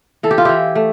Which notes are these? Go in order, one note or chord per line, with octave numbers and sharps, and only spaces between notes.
E3 A4
G4
F4
E3 E4 G4
A3